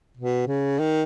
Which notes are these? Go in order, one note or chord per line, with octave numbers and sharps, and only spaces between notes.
B2
C#3
D#3